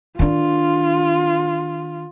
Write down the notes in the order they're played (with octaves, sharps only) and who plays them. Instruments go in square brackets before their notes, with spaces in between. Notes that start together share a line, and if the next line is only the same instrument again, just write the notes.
[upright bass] D#3 D4 [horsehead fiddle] F4